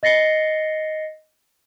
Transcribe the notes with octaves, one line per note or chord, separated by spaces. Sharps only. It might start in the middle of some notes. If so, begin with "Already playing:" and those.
D#5 A6 A#6 C7 C#7 G7